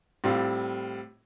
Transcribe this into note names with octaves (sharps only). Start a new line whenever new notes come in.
A2 G3 C4 F4